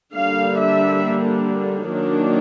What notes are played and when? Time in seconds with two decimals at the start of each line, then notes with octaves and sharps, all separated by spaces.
0.14 D3 G3 A#3 D4 F5
0.58 E5
1.89 D#3 F#3 A#3 D4